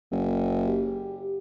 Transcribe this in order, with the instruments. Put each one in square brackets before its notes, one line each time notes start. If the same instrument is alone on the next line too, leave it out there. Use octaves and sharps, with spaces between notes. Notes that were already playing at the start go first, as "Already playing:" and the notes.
[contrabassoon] F#1
[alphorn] G4